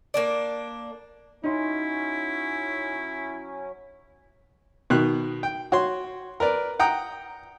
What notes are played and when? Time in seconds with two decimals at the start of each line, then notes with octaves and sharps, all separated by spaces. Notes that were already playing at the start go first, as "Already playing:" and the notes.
0.14 A#3 D4 D5
1.44 F#3 C#4 D#4 E4 C6
4.90 B2 D#3 F#6
5.43 G5
5.72 F#4 C#5 C6
6.40 A#4 B4 D5
6.79 F#5 G5 A#5 D#6